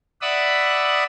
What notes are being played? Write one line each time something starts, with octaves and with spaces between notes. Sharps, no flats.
D5 E5 F#5 B5 D#6 E6